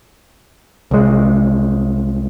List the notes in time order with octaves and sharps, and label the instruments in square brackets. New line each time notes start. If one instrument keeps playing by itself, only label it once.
[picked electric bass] C2 G#3